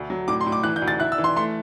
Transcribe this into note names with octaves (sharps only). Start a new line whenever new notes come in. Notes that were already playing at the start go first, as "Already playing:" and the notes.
Already playing: D2 A3
F#3
A2 D6
C6
A2
D6
E3 F#6
G6
D2
A6
E4 F#6
E6
E3
C6
A3 C6